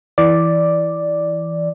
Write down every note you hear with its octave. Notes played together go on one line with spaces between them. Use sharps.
E3 D5